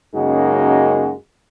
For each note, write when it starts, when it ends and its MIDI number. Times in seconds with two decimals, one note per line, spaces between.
0.14 1.12 42
0.14 1.12 49
0.14 1.12 56
0.14 1.12 58
0.14 1.12 63
0.14 1.12 66